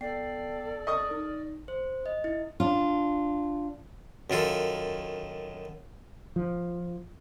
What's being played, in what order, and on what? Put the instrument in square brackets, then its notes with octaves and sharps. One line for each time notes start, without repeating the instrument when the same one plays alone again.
[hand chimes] B3 G5 C7 [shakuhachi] A4 [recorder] D5
[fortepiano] D#5 C#6 D#6 [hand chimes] F6
[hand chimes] D#4
C5
D#5
E4
[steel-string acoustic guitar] D4 F4
[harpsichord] F#2 D#3 F4 A4
[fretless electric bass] F3